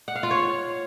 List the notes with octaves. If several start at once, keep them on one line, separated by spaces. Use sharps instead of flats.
F#5
F5
F4
C#5